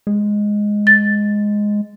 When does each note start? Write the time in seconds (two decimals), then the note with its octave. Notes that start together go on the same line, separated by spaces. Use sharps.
0.07 G#3
0.87 A6